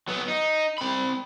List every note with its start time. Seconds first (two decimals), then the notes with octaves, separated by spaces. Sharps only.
0.08 F#3 B3
0.28 D#4
0.78 C4 B5